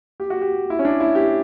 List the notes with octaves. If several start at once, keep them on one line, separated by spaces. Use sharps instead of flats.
G4
F#4
G4
E4
C#4
D4
E4
G4